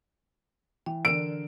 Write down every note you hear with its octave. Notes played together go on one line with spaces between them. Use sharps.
E3 G5
D3 E3 A#4 D7 E7